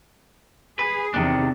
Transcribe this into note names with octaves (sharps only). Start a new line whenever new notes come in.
G#4 B4
E2 C3 D#3 D4